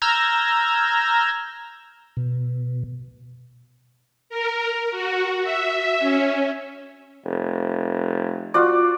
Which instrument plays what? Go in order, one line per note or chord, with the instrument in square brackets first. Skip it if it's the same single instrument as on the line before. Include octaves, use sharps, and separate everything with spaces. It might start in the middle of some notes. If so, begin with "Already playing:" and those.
[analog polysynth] A#5 E6 F6 G6 G#6 A#6
[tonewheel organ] B2
[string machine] A#4
F#4
E5
C#4
[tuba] F1
[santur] F4 F#4 D5